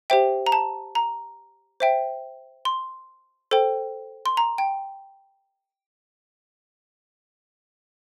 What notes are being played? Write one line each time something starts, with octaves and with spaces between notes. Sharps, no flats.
G4 C5 E5 G5
A#5
A5
A#5
C5 E5 G5
C6
A4 C5 G5
C6
A#5
G5